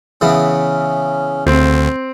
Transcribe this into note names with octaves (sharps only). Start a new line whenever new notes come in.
C#3 E3 B3 C#4
D2 C4